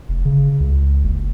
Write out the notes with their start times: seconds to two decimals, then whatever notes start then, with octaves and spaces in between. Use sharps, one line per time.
0.09 F1
0.25 C#3
0.60 C#2
1.04 F#1